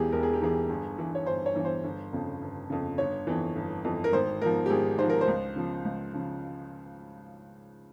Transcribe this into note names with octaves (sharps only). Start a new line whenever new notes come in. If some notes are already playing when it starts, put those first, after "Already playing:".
Already playing: E1 E2 E3 G4 G#4
E1 A#4
G#4
G4
E2 E3 G#4
G1
G2 E3
C#5
G1 C5
C#5
G2 E3
C5
G1
F2 C#3
G1
F2 C#3
G1 C#5
F2 E3
G1
F2 E3
A#4
G#1 C5
G#2 F3 A#4
G4
G#1 G#4
G#2 F3 C5
A#4
C5
C#2
C#3 F3
C#2
C#3 F3